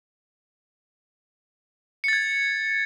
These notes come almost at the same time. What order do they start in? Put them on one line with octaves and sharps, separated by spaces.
C#7 A6 G#6